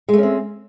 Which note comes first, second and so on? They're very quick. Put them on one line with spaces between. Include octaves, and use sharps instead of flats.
G#3 A3 C#4 C4